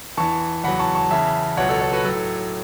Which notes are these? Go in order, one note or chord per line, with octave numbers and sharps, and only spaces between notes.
E2 E3 A5 C#6
E2 C#3 F#3 F#5 B5
A5 C#6
A5 C#6
E2 C#3 E3 E5 A5
C#2 B2 F#3 C#5 F#5
A4 C#5
A4 C#5
F#4 B4
A2 F#3 A4